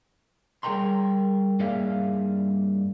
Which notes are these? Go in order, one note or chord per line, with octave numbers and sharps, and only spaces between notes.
G3 G#4 A#4 G5 A#5 C6
G2 A#3 G#4 D5 E5 F5